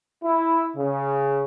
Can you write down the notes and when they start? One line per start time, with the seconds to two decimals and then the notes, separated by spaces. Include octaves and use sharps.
0.23 E4
0.77 C#3